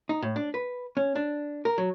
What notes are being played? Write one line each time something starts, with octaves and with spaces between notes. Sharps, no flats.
D#4
A2
D4
B4
C#4
D4
A#4
F#3